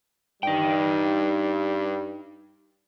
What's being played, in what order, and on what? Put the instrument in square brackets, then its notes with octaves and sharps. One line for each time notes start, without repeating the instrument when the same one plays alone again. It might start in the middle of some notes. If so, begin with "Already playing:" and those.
[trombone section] G2 G3 [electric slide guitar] D#4 G5